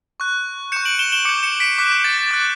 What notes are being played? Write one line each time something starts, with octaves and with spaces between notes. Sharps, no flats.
C#6 F#6
C#6 G6 C#7 E7
D7 F#7
E7 G7
E7 G7
D6 G6 C#7 E7
C#7 E7
B6 D7
D6 F#6 B6
G6
A6
A6
D6 F#6 A6